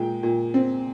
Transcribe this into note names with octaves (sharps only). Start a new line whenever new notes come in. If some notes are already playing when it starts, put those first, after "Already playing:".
Already playing: A#2 G#3 G5
A#2
C4